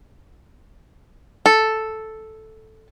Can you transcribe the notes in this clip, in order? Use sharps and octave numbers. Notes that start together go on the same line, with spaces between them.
A4